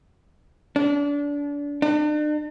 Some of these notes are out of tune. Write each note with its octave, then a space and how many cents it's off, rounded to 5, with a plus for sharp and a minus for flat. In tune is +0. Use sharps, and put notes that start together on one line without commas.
D4 -30
D4 +40